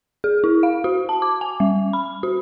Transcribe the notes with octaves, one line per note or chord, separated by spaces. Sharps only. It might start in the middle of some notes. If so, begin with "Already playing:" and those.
G#4
E4
F5
F#4
A5
D6
G#5
G3
B5
F#4